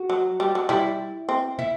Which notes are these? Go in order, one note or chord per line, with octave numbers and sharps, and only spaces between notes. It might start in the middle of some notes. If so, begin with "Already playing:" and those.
Already playing: F#4
F#3
G3
F#3
G3 E4
C4
E4